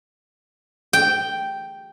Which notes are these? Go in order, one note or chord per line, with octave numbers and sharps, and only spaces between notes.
G5